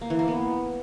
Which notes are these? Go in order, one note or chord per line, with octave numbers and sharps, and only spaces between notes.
A#3
E3
A#3
B3